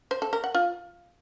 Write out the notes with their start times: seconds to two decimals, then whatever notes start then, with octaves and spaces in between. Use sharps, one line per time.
0.11 C5
0.22 A4
0.33 A#4
0.44 F#5
0.55 F4